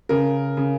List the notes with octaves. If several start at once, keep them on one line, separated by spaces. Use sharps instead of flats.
C#3 A#4
C#3